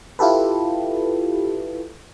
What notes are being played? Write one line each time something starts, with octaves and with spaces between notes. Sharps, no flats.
E4 F4 G4 A4 B4